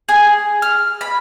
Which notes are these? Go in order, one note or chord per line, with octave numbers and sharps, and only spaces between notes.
G#4
F6
B5